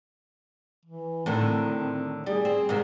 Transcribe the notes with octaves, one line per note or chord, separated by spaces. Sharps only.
E3
A2 D3 D#3 C4
G3 G#4
C4
G#2 C3 D#3